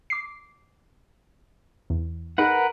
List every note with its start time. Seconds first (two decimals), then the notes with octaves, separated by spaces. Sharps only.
0.10 D6 C7
1.90 E2
2.38 D#4 G#4 A#4 B4 F#5